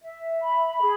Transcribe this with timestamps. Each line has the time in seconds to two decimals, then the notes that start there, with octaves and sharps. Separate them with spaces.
0.02 E5
0.42 B5
0.80 G#4